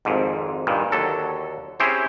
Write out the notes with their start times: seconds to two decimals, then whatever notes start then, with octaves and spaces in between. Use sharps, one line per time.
0.05 G#1 F2 G#2
0.67 G2 A#2 D#3
0.92 D#2 D3 F#3 A4
1.80 C4 C#4 E4 G4 G#4 C5